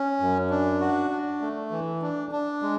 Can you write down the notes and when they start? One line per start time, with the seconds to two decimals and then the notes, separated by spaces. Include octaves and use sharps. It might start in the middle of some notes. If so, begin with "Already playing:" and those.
Already playing: C#4
0.20 F#2
0.50 D4
0.80 F#4
1.11 D4
1.41 A3
1.71 E3
2.02 D4
2.31 D4
2.62 G#3